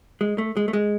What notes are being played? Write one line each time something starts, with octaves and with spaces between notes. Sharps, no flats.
G#3
A3
G#3
A3
G#3